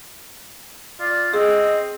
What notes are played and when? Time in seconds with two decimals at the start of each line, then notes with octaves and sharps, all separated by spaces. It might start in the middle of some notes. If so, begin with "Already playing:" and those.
1.00 F4 D5
1.34 C4 G#4 D#5